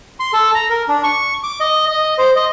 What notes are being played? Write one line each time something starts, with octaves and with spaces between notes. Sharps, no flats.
C6
A4
A#5
A#4
D4
C#6
D6
D#5
D#5
C5
D#5